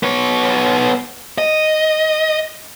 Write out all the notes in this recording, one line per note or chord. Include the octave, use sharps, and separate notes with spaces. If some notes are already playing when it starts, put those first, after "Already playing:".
B3 C#5
D#5